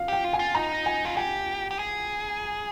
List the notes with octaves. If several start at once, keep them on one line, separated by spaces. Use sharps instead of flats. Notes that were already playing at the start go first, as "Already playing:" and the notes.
Already playing: F5
G4 G5
F4
G#5
F4
D#4 A#5
G#5
F4
G4 G#5
G4
G#4